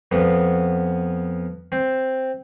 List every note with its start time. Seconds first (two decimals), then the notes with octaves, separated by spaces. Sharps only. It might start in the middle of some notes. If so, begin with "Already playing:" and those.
0.11 F2 B3
1.72 C4